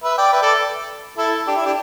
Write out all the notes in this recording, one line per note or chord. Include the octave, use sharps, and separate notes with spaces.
B4 E5
D5 G5
B4 E5
A4 D5
E4 A4
D4 G4
E4
D4 G4